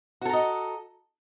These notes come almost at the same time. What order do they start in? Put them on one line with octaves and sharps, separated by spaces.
F#4 A4 A#5 D#5